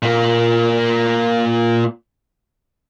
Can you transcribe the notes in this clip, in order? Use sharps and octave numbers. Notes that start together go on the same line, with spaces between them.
A#2 A#3